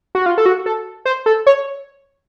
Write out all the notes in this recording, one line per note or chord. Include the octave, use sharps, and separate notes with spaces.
F#4
F4
A4
F#4
A4
C5
A4
C#5